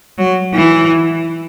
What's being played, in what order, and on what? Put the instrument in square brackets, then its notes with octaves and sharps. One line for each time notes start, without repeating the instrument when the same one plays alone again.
[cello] F#3
E3